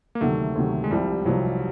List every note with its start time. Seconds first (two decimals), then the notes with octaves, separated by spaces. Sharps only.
0.15 A#3
0.21 D2 C3 D#3 F#3 A3
0.55 D2 C3 D#3 F#3
0.84 G#3
0.91 C2 C3 F3 G3
1.25 C2 C3 F3 F#3